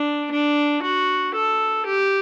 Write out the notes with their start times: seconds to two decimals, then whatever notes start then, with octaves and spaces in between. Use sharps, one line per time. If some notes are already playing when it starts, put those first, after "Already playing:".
Already playing: D4
0.31 D4
0.82 F#4
1.35 A4
1.86 G4